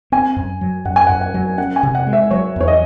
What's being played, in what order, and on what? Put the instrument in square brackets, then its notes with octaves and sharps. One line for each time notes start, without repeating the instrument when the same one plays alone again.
[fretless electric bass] C4 [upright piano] G#5
[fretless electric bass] F#2
F#3
[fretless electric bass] F#2 [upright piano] F#5
[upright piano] G#5
[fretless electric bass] F#2 [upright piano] F#5
[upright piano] F#5
[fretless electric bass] F#3
[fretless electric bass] C#4 [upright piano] F#5
[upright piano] G#5
[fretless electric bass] C3
[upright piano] F#5
[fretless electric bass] G#3
[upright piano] E5
[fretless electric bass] F#3 [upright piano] C#5
[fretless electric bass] E2 [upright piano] C#5
[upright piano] D#5